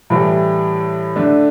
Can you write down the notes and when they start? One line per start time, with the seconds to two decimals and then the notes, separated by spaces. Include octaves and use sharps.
0.10 A2 E3 G3 E4
1.16 D3 A3 D4